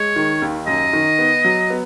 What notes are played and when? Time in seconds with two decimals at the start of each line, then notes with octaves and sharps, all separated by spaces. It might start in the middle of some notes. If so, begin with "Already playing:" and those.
Already playing: G#3 C#5
0.16 D#3
0.42 D#2
0.67 F#2 D#5
0.93 D#3
1.19 B3
1.45 F#3
1.70 B3